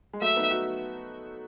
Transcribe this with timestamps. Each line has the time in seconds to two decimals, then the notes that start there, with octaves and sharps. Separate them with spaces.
0.13 G#3
0.21 F#3 A3 E5
0.36 B3 D#4
0.51 D#4 F#4